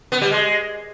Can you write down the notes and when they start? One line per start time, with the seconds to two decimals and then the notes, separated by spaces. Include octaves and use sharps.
0.12 B3
0.21 G3
0.31 G#3